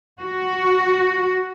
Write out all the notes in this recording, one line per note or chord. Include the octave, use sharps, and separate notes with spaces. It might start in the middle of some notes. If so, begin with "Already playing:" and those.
F#4